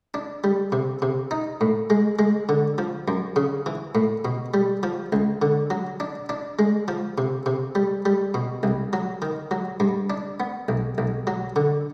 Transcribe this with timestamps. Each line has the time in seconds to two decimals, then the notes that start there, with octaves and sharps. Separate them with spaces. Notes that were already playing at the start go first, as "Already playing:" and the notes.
0.14 D4
0.44 G3
0.72 C3
1.02 C3
1.31 D#4
1.61 A2
1.90 G#3
2.19 G#3
2.49 D3
2.78 F3
3.08 F#2
3.36 C#3
3.66 E3
3.95 A2
4.25 B2
4.54 G3
4.83 F3
5.13 C#2
5.42 D3
5.70 F#3
6.00 D4
6.29 D4
6.59 G#3
6.88 F3
7.18 C3
7.46 C3
7.75 G3
8.06 G3
8.34 B2
8.63 C2
8.93 F#3
9.22 D#3
9.51 F#3
9.80 G2
10.10 D4
10.40 B3
10.69 B1
10.98 B1
11.27 F#3
11.56 D3